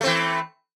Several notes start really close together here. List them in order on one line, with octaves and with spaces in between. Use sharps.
A3 C4 E3